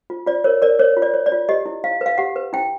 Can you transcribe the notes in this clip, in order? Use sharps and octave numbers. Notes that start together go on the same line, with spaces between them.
F4
F4 D5
A#4 C#5
A#4 D5
A#4 C#5
F4
D5
C#5
D5
F4
G4 D#5
E4
E4 F5
B4 F5
G4 F#5
B4
E4 G5